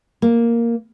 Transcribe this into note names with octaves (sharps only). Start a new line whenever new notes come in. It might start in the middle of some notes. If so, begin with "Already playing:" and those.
A#3